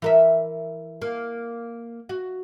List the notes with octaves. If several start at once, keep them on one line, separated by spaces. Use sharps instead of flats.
E3 A#4 E5
A#3
F#4